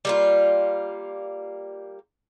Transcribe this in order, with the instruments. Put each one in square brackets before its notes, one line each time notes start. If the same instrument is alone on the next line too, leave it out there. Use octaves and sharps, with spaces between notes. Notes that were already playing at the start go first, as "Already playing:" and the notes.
[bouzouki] G3 A#3 F4